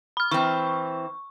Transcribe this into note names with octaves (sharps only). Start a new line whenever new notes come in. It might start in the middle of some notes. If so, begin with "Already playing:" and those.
B5 F6
E3 C4 C#6